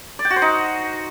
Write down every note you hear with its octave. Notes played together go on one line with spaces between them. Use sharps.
D5
G5
F#4
C5
D#4